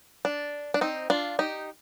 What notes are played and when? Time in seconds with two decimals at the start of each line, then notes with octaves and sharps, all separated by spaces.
0.25 D4
0.74 D4
0.81 C4 D#4
1.10 D4 F4
1.39 D#4 G4